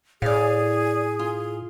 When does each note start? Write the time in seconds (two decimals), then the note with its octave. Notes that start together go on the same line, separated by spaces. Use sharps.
0.22 A2 G#4 D5 F5
1.19 F4